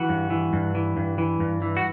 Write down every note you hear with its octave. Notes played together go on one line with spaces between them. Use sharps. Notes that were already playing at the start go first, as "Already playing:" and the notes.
Already playing: E3 F#4
G2
E3
G2
E3
G2
E3
G2
E3
F#4